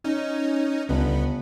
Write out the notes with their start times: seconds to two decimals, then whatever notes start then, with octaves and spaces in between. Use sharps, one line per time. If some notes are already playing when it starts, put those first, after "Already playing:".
0.04 C#4 D#4
0.89 G1 C#2 B3